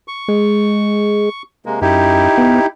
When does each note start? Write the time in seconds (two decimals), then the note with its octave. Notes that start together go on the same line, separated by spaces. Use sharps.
0.08 C#6
0.28 G#3
1.66 C3 G#3 A#3
1.82 F#2 D#4 E4 G4
2.38 B3